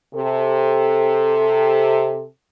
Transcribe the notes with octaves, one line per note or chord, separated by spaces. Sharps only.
C3 A4